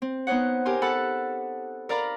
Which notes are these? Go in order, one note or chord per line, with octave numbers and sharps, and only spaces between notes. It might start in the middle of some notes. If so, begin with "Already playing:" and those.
C4
B3 D#4 C5 C#5 F#5
G4 A#4 G#5 C6
A4 F#5 A5 B5
A#4 D5 F5 A#5 B5